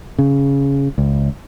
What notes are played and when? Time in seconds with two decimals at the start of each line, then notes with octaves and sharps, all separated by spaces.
0.19 C#3
0.98 C#2